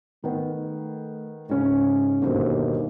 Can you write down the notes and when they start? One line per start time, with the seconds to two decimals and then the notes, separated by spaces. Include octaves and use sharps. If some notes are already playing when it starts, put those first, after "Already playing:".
0.24 D#3 A3 B3
1.50 G#2 C#3 C#4 C#5
2.22 G1 D#2 B2 C5